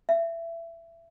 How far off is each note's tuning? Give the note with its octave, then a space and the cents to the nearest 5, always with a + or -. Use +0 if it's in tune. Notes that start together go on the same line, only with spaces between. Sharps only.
E5 +20